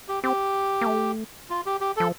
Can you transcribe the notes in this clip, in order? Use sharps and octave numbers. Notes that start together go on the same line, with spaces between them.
G4
C4 G4
A#3
A3
F4
G4
G4
F3 A4